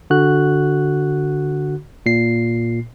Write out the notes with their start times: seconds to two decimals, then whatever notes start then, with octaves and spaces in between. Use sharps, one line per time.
0.10 D3 F#4 F#6
2.06 A#2 C7